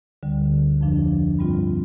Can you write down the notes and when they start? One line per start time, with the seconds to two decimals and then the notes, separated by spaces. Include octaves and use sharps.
0.23 D2 D3 G3
0.81 F2 F3 D4
1.39 G2 G3 C4 F4